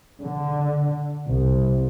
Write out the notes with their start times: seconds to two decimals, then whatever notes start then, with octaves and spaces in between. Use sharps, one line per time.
0.22 D3
1.27 C2